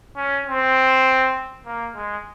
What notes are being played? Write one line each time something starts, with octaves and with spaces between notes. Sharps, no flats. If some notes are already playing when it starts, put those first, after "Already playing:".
C#4
C4
A#3
G#3